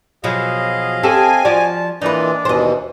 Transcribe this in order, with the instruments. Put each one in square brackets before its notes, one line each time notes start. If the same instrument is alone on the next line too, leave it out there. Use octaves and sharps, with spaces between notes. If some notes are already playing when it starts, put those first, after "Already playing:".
[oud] B2 F3 F#3 [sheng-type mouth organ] G#4 D#5 F5
[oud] C4 G4 A4 [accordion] G#5
[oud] F3 F#4 D5 [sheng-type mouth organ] A5
[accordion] A#2 E3 [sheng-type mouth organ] D4 D5 [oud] D#4 B4
[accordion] D#2 B2 E3 [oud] C5 D#5